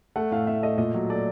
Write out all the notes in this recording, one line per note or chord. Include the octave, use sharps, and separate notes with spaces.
A3 F#5
A2 F5
A2 E5
A3 D#5
A#2 D#5
F#3
A3 D5